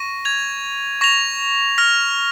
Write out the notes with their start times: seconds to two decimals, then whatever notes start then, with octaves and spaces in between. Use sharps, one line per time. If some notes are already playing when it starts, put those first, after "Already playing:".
Already playing: C#6 A#6 D#7
0.25 G#6 F7
1.01 C#6 A#6 F7
1.78 F6 A#6 F7